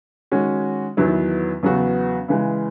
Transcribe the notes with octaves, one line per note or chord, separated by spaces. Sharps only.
D#3 G#3 C#4 F#4
E2 D#3 F#3 B3 E4
E2 C#3 F#3 B3 F#4
C#3 E3 G#3